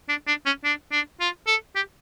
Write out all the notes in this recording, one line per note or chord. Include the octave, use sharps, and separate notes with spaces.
D4
D4
C#4
D4
D4
F4
A4
G4